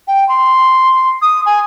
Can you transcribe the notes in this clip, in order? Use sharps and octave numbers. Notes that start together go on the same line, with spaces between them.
G5
C6
D#6
G#5